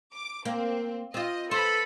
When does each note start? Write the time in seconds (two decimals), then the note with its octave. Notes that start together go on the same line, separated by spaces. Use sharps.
0.14 D6
0.45 A#3 C4
1.14 C4 F4 D#5
1.51 A4 B4 C5 B5